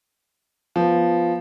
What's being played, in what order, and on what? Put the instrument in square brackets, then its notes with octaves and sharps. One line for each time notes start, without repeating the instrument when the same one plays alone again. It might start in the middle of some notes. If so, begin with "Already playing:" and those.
[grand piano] F3 B3